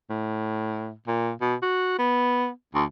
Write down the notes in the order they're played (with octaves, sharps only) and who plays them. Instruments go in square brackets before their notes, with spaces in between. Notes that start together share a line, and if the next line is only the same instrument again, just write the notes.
[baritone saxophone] A2
A#2
B2
F#4
B3
D2